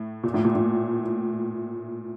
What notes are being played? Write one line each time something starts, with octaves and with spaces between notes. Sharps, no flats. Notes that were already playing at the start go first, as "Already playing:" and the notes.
Already playing: A2
A#2
A2
A#2
A2